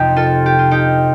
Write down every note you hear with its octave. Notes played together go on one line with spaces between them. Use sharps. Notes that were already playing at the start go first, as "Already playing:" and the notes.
Already playing: F2 C3 F3 D#4 G4
F4 A4
G4
F4
D#4 G4